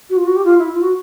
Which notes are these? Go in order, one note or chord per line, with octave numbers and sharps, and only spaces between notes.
F#4
F4
F#4
G4
F4
E4
F4
F#4